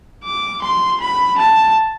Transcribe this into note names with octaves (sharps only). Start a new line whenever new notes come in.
D6
C6
B5
A5